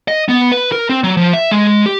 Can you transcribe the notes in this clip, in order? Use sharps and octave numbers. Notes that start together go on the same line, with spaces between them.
D#5
B3
B4
A#4
C4
F#3
F3
E5
G#3
G4